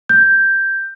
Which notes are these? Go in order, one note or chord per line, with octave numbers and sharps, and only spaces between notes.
G6